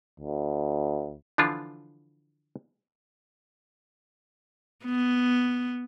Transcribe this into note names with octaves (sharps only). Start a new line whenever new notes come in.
D2
D3 E3 F3 D4 F4
B3